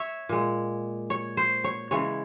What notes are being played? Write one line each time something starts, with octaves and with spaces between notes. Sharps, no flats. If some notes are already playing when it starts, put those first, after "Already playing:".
Already playing: C#5 E5
A#2 G#3
C#5
C5
C#5
C#3 E3 G#3 C#5